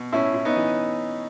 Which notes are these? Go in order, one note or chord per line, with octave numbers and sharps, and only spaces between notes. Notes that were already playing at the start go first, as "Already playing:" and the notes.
Already playing: B2
A2 C#4 E4
A2
B3 D#4
E3